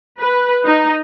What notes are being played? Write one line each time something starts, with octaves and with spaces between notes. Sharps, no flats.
B4
D#4